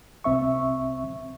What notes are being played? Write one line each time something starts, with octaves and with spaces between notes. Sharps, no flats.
C2 C4 E5 C#6